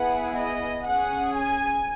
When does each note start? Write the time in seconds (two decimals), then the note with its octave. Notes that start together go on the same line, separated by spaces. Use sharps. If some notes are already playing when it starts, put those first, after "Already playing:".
Already playing: B3 E4 G#4 F#5
0.35 D#5
0.85 C#4 G#4 F#5
1.36 G#5